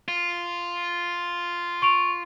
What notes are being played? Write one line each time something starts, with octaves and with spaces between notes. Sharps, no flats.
F4
C#6 D7 F7